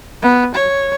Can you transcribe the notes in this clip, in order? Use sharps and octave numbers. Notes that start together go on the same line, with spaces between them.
B3
C#5